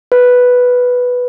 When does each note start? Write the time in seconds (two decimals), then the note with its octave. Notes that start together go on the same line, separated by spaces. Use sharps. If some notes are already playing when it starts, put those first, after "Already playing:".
0.12 B4